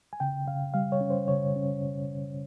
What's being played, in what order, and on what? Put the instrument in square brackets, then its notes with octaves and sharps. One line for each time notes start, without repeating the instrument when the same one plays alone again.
[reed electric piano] G#5
C#3 G5
C#3 F5
G3 F5
C#5
C#4
C5
C#3 C#5
C#4